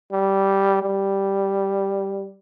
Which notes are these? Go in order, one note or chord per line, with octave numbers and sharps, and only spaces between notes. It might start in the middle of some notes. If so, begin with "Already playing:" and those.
G3
G3